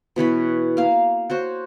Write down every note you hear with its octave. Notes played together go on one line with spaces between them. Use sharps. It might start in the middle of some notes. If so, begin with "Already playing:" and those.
B2 E3 C#5 B5
A#3 F5
F#4 C5 C#5